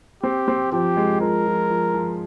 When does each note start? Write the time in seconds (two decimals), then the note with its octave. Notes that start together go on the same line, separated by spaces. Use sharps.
0.23 C4 G4
0.48 C4
0.72 F3 G4
0.97 G#3
1.21 F3 A#4
1.46 F3
1.70 F3
1.94 F3